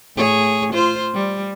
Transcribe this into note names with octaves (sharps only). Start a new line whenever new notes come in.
A2 G#4 C#5
F4 C5
G3